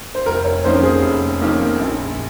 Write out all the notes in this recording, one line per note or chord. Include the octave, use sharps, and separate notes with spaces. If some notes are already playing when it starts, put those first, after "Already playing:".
C5
F1 A#4
C#5
F2 D#3 A#3 C#4 C5
G#4
F1
F2 D#3 A#3 C#4
A#1